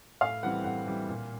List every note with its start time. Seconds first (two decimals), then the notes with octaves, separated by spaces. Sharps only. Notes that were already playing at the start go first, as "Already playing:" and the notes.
0.21 A2 F5
0.43 E3 G3 C4 F#5
0.64 A2 F#5
0.86 E3 G3 C4
1.09 A#2